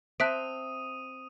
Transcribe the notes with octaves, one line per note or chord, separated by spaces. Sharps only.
C4 E5 A5 D#6 F#6 B6 D7 D#7